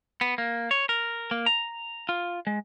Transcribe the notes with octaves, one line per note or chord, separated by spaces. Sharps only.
B3
A#3
C#5
A#4
A#3
A#5
F4
G#3